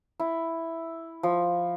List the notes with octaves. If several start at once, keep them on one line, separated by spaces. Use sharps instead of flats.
E4
F3